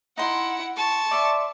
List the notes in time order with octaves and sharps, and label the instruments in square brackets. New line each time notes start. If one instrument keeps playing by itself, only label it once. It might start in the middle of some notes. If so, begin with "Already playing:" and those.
[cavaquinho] D#4 C6 [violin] E4 F#5
[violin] A5 C#6 [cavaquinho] C6
[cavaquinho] D5 E5 C6